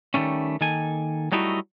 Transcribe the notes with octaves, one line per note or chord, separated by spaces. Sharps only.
D#3 G3 A3 C#4
D#3 A#3 A4 G#5
F#3 G3 A3 D#4 E4 F#4